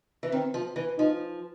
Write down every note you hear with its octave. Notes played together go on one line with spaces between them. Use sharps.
E3
D#3 C4
F3
E3
F3 D#4